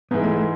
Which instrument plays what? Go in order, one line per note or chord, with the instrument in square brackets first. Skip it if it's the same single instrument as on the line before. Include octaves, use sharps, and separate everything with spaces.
[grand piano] G#2 E3 G#3 [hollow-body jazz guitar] B3
[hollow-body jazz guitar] A3
A3